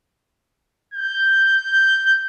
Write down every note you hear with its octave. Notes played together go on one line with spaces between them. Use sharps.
G6